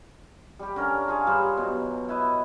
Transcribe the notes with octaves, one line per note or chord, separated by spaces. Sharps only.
G3 G4
D3 C#4 A#4
F4 G#4 C#5 F5
G2 G3 C5
B2 F#3
E4 B4 D#5